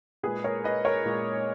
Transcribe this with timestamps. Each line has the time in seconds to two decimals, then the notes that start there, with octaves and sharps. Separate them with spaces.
0.23 A#2 G#3 G#4 B4
0.44 A#4 C#5
0.64 B4 D#5
0.85 A#4 C#5
1.05 A#2 G#3